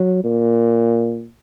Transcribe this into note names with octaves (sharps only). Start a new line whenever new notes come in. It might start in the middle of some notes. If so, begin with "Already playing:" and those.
Already playing: F#3
A#2